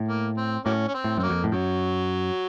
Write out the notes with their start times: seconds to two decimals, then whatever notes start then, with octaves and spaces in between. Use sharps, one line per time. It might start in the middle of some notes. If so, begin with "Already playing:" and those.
Already playing: A2
0.08 A#3
0.37 C4
0.65 A2 F#3 A#3 C#4
0.88 C#4
0.94 C4
1.04 A2
1.17 F#2 C4
1.23 F#3 A#3
1.30 F2
1.44 A2
1.52 F#2 F#3